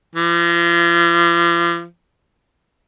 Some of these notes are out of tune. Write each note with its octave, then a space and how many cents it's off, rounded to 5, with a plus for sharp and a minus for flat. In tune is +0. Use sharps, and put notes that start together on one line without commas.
F3 -40